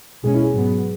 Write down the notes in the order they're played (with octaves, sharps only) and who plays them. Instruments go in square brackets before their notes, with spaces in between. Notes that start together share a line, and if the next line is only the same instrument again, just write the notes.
[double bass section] B2 G#3 C#4 [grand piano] G#4
[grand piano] E4
G#4
[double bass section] G#2 F#3 B3